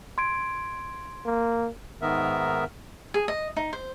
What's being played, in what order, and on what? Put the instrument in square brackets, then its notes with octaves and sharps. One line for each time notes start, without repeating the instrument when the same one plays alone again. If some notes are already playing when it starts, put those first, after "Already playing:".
[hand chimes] C6 G#6 D7
[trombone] A#3
[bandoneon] G#2 D#3 B3 A#4 E5
[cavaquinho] G#4
D#5
D#4
C5